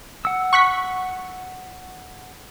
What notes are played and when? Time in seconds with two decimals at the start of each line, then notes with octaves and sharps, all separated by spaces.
0.25 F#5 E6
0.53 C#6 F#6 B6